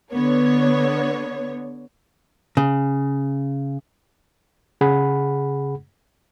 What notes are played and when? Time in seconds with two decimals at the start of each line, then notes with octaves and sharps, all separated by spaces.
0.12 D3 B3 C#5
2.57 C#3
4.81 C#3 G#4 F#5 B5